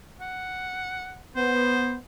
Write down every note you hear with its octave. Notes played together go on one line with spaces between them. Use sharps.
F#5
B3 C5